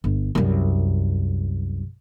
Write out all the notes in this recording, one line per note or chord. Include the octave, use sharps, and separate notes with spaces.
G1
C2 F#2